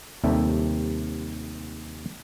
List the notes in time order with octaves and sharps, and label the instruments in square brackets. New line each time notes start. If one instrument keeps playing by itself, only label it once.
[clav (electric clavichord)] D#2 C3 G3 A4 E5